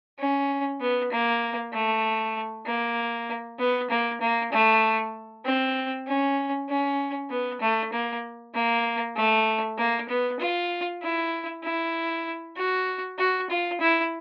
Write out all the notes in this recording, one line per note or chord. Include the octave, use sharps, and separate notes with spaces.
C#4
B3
A#3
A3
A#3
B3
A#3
A#3
A3
C4
C#4
C#4
B3
A3
A#3
A#3
A3
A#3
B3
F4
E4
E4
F#4
F#4
F4
E4